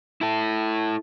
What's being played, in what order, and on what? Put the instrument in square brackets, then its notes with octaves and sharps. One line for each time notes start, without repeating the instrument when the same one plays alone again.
[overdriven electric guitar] E4 A4